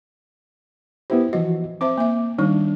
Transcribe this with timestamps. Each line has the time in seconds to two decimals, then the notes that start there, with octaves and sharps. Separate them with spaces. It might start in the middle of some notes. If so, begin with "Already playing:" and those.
1.10 B3 E4 G4 C5
1.33 E3 F3 F#4 D#5
1.81 C4 C5 E5 D6
1.97 A#3 E5
2.38 D#3 G3 D4 D#4